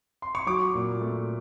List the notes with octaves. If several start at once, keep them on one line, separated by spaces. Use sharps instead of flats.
C6
C#6
F#3 D6
A#2
A3